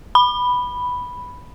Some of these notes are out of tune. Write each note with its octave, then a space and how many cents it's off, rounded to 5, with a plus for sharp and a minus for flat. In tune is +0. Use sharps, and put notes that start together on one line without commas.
B5 +0